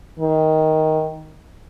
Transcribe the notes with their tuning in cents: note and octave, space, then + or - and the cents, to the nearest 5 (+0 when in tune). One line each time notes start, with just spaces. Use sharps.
D#3 +10